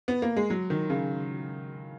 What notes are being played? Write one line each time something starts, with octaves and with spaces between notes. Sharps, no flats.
B3
A#3
G#3
F#3
D#3
C#3